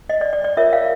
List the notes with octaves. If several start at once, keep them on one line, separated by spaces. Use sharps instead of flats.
D#5
D5
D5
D5
F4 A#4 C#5 E5
F5